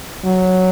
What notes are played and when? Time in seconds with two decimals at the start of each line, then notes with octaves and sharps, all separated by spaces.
0.25 F#3